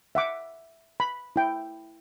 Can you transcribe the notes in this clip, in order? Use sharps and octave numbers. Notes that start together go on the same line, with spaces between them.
E5 F#5 D6
B5
E4 G5